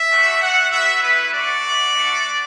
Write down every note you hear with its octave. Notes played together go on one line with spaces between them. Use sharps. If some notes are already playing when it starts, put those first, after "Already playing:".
Already playing: E5
A3 D4 F#4
A3 F#4 F#5
B3 F#4 E5
A3 E4 B4
A3 D4 F#4 D5
A3 F#4
A3 D4 F#4